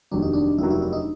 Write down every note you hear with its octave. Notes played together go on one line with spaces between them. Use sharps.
F1 D#2 D#3 F#3 D4
D#4
D4
F1 D#2 D#3 F#3 E4
E4
E4
D#4